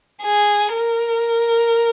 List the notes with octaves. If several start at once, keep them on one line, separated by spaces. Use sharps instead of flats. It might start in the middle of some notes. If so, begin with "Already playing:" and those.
G#4
A#4